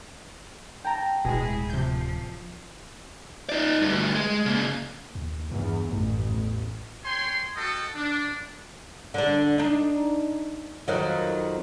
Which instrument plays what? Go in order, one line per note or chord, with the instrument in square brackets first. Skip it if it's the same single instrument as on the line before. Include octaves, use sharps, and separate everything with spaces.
[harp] G5 A5 A#5
[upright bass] D1 [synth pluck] B2 G#3 [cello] E4 G#4 [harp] G#5 A#6
[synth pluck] C3 G6 [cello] F3
[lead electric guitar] D#4 D5
D2 G2
G#3
C#3 A#3
[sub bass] D#2
[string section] E2 [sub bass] G2
[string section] A1 [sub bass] F#2
[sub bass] E2
[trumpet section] C#5 G5 G#5 C6
F#4 A4 D#5 G5 D#6
D4
[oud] D3 D4
D4 D#4
F2 D#3 F#3